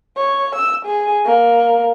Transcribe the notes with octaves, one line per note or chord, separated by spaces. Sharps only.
C#5
E6
G#4
A#3